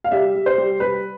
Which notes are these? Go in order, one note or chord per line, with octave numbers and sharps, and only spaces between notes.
F5
G3 E5
G3
C5
G3
G3 B4